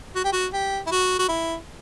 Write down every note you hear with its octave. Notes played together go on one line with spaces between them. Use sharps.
F#4
G4
F#4
G4
E4
F#4
F#4
E4